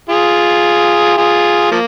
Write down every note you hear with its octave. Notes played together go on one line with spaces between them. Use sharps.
F4 G#4
F4 G#4
F3 A#3